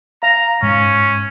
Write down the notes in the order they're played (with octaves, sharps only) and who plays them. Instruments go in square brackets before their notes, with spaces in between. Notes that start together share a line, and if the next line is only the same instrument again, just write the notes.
[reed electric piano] F5 [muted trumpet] A#5
[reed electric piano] G#2 [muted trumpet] C#4